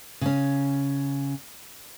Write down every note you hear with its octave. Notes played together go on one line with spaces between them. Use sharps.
C#3 C#4